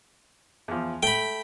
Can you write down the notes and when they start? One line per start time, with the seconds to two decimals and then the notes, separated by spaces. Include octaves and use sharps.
0.68 E2 F3
1.03 A3 G5 B5